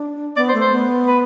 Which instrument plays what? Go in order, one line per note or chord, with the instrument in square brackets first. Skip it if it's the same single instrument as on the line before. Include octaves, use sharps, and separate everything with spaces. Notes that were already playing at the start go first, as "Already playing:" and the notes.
Already playing: [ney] D4
[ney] B3 [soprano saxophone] D5
[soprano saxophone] C5
[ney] A3
[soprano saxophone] C5
[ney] B3
[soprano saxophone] B4